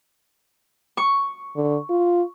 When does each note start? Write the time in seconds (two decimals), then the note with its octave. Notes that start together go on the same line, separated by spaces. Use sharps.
0.97 C#6
1.56 D3
1.90 F4